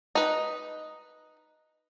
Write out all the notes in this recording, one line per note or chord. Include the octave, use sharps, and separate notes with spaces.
D#4 B4